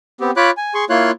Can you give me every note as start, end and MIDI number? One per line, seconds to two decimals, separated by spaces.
0.20 0.31 59
0.20 0.31 60
0.20 0.31 67
0.37 0.51 65
0.37 0.51 73
0.37 0.51 83
0.37 0.51 86
0.37 0.51 90
0.57 0.74 80
0.74 0.85 68
0.74 0.85 84
0.74 0.85 85
0.90 1.11 58
0.90 1.11 64
0.90 1.11 65
0.90 1.11 73
0.90 1.11 84
0.90 1.11 90